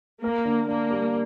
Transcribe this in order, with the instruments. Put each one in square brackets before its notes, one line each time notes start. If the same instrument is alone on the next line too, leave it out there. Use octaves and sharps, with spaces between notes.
[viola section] A#3 [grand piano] A#4
[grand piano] D3
[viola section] A#3 [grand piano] D4
[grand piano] G3